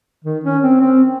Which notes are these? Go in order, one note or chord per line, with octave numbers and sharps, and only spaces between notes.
D#3
C#4
C4
C4